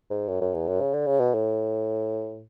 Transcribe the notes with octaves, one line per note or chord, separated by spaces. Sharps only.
G#2
F#2
F#2
E2
F#2
C#3
D3
C#3
B2
A2